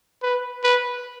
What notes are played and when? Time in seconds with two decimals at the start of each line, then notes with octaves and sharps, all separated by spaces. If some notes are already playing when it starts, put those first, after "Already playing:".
0.23 B4
0.64 B4